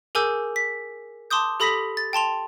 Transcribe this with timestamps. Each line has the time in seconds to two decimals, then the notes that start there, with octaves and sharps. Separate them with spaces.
0.15 G#4 A#4 G#5 D6 E6 G6
0.56 B6
1.30 A5 C6 D6 D#6 G6
1.60 G4 A4 B5 D#6 A#6 B6
1.97 A6
2.13 G5 A5 C6 F7